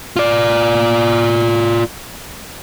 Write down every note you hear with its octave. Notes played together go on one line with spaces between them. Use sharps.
F4 D5